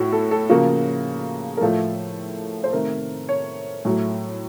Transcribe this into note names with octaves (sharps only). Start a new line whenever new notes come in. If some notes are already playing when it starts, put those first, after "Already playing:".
Already playing: A2 F#4
A4
A4
C#3 F3 A#3 F#4
A#4
A2 F3 A3 A4
C5
C3 D#3 A3 A#4
C#5
A2 F#3 A3